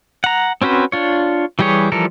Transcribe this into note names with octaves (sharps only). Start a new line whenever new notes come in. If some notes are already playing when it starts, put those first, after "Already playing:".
F#5 A#5
C4 C#4 F#4 B4 C5
D4 F4 C#5
E3 G3 G4 G#4 C#5
E3 F3 G3 A4 A#4